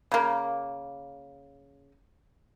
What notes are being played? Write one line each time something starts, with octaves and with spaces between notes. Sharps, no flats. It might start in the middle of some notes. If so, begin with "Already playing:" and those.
C#3 A#3